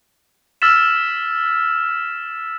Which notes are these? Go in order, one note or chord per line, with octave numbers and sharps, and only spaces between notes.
E6 F6 A6 B6 E7